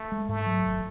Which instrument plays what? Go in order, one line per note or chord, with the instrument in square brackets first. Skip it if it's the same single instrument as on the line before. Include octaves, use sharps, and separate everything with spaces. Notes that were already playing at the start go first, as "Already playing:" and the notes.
Already playing: [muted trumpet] A3
[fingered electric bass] G#3
[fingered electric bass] G#2 [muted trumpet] A3
[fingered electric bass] F#3
G#1